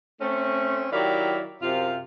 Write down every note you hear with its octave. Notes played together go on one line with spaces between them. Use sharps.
A3 C4 C#4
D#3 F#3 E4 G4 D5 F5
F#2 C3 F4